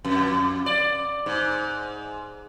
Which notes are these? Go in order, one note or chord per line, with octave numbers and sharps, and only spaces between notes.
F2
D5
G#2